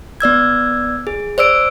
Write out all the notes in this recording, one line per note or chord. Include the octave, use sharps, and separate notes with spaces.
B3 D5 E6 G#6
G#4
C5 D5 E6 D7